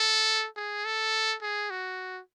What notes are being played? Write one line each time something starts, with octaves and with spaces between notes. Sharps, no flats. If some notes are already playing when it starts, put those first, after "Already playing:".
Already playing: A4
G#4
A4
G#4
F#4